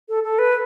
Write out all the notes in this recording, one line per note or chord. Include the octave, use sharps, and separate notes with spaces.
A4
A4
B4